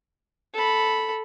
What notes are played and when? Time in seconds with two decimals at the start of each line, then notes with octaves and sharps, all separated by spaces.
0.54 A4 B5